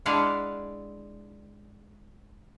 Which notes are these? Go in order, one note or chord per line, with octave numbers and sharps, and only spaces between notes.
G#3 D4 E4 F5 F#5